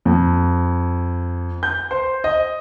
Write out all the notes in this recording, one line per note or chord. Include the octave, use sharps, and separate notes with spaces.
F2
G6
C5
D#5